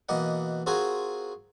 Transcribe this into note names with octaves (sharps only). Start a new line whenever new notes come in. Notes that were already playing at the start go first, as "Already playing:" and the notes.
B2 E3 A#3 D#5 F#5
C4 F4 F#4 G#4 A#4 G#5